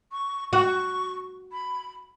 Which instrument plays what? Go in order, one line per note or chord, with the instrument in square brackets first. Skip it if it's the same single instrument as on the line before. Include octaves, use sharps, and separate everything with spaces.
[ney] C#6
[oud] F#4 [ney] C#6
[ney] B5